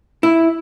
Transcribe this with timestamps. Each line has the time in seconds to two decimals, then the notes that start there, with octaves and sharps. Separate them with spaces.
0.23 E4